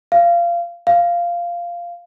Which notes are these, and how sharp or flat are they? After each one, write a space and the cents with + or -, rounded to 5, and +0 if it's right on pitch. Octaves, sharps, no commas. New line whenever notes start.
F5 -20
F5 -10